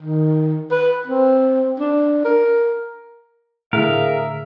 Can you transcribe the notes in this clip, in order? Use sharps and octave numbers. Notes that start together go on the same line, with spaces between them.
D#3
B4
C4
D4
A#4
A2 D3 G#4 A#4 E5 F5